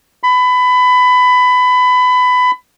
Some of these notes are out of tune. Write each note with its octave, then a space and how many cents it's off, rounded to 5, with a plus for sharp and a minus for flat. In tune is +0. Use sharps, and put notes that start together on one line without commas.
B5 +20